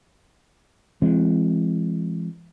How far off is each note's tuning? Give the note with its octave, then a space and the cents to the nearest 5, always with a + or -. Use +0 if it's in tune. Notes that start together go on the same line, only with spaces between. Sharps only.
E3 +40 G#3 +0 C4 +10